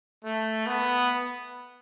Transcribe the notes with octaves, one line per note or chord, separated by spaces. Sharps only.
A3
B3